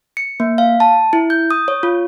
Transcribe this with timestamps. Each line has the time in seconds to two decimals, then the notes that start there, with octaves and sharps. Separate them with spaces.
0.17 C#7
0.40 A#3
0.58 F5
0.80 A5
1.13 E4
1.30 G6
1.51 D#6
1.68 C#5
1.83 F4